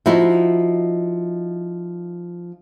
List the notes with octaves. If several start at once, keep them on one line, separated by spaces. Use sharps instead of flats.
F3 D#4 E4 F#4